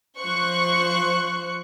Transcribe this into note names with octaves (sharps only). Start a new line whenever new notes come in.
F3 C5 C#6 F#6